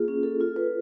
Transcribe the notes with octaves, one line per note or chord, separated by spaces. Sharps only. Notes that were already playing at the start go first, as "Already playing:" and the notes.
Already playing: A#3 F4 G#4
C#4
A4
F4
B4